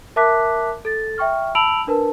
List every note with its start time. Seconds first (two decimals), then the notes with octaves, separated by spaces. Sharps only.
0.16 A#4 E5 A5 D6 F#6 B6
0.85 A4 A6
1.18 E5 G5 C#6 F6
1.55 A5 B5 E6 D7 F7 F#7
1.87 D4 A#4 B4 A5